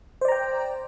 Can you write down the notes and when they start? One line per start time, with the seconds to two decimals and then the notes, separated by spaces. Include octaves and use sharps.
0.21 C5
0.25 D5
0.28 A#5
0.32 G5